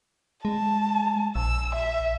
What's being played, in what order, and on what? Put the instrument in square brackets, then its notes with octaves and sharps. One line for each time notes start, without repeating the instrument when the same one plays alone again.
[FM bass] G#3 [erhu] A5
[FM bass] A#1 [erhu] E6
[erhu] E5